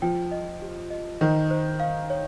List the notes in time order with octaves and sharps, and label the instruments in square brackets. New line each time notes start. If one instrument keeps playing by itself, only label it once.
[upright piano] F3 [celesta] G5
[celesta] D#5
G4
D#5
[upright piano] D#3 [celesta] C5
[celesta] C5
F5
C#5